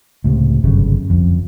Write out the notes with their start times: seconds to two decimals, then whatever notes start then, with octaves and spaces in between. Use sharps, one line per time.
0.24 C#2 A2 C3
0.64 G1 C2 F#2 C#3
1.10 F2